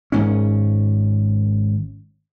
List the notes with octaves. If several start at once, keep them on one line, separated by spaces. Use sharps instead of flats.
G#1 G#2 C#4